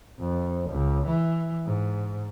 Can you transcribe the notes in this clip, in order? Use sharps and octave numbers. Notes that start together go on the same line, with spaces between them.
F2
C#2
E3
G#2